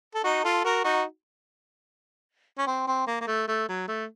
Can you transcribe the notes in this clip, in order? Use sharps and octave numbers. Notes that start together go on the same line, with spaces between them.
A4
D#4 F#4
F4 A4
F#4 A#4
D#4 F#4
C#4
C4
C4
A#3
A#3
A3
A3
F#3
A3